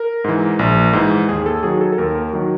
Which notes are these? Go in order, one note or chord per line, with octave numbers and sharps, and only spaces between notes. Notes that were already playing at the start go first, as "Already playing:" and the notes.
Already playing: A#4
G#2 E3
A#1
G#2 E3
D#2 G#4
A4
D#3 F#3 G#4
A4
A4
D#2 A#4
A#4
D#3 F#3